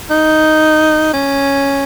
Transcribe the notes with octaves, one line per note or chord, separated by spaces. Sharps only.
D#4
C#4